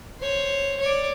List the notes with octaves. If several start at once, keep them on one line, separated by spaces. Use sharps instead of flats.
C5 C#5
C#5 D5